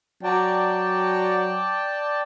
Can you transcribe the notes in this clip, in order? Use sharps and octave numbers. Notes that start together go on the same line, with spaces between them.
F#3 D5 G5 A5